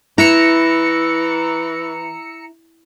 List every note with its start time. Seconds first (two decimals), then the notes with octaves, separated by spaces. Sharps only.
0.18 E3 E4 A#5 E6 C#7